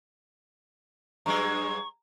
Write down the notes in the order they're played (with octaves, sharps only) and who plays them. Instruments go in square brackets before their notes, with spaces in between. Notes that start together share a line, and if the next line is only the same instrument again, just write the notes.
[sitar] G2 F#3 G#3 [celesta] A#5 [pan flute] C#6